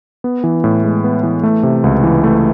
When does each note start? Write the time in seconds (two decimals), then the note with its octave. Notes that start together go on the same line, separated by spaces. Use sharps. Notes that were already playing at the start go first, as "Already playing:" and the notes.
0.24 B3
0.44 E3
0.64 A2
0.84 G#3
1.04 B3
1.23 E3
1.43 A3
1.63 C3
1.84 C#2
2.03 E3
2.24 A3